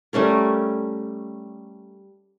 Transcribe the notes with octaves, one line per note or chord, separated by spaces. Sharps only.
G3 A3 C#4 A#4